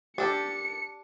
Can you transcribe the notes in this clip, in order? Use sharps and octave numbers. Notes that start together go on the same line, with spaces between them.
D4 G4 A4 C#7